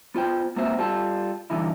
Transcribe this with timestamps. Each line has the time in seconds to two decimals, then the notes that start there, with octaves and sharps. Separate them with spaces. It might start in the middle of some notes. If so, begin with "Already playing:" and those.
0.15 B3 F4 C5 G5
0.56 G#2 A#3 C4 F#4 C5 E5
0.79 G3 F4 A4
1.50 G2 B2 D3 E3 D#4 E4